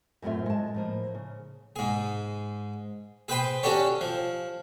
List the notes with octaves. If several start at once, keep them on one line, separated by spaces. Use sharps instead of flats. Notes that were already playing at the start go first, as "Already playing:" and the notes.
F#2 A2 A3 C4 F4 E5
G#3 A5
A2 F3 A#3
C#3
G#2 G#4
G#4 B4 C5 G5 B5 C6
C#4 D4 F#4 G4 A4 C#5
F3